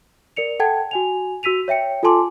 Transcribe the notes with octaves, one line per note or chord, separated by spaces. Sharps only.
A#4 D5 C#7 F7
A4 F#5 G5 A5 G#6
F#4 G#5 F7
F#4 E6 B6 D#7 F7
C#5 E5 G5 C#7
F4 A4 G#5 A5 C6 D6